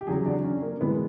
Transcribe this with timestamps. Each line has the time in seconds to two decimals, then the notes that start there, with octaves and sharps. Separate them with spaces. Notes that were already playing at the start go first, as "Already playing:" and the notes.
0.01 G4
0.07 E2 C#3 F#3 G#4
0.26 D4
0.44 C#4
0.62 A#3
0.81 A2 E3 G#3 B3